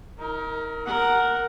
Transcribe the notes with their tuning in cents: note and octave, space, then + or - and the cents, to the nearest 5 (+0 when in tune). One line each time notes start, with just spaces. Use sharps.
D#4 +40 A#4 +0
A#4 +0 F#5 +0